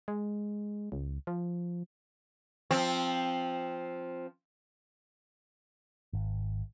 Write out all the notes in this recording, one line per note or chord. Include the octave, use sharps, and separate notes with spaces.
G#3
C#2
F3
F3 C4
G#1